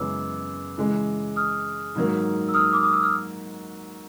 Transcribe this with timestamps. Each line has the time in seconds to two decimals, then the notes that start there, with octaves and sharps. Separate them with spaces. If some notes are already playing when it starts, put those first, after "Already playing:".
Already playing: F#2 C#3 E3 G#3 B3 D6 E6
0.78 C#3 E3 G#3
1.36 D#6 F6
1.95 G#2 D#3 F#3 A#3
2.49 E6
2.54 D#6 F6
2.73 D6
2.83 D#6
2.93 E6
3.03 F6